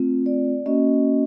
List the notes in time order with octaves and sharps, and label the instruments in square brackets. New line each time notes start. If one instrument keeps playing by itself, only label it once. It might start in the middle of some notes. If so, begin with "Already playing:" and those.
Already playing: [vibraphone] A3 C4 F4
D5
A#3 C#4 F#4 D#5